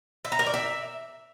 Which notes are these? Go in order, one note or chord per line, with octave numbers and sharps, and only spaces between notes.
E5
A#5
A#4
D5
E5